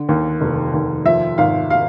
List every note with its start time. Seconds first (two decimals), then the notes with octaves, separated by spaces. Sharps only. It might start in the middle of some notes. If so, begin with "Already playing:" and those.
Already playing: D3
0.09 D#2
0.41 F1
0.74 D#2
1.05 F3 E5
1.38 G#1 F5
1.70 F5